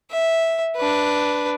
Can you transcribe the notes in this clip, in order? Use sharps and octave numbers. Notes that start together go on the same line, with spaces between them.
E5
D4 B4